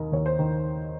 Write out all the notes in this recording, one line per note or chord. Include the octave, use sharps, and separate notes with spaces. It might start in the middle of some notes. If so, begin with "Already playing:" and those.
Already playing: D#2 D#3 A#4 D#5
D#2 C#5
C5
D#3